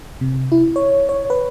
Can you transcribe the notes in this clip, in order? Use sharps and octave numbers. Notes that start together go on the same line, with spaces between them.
C3
E4
C#5
C#5
B4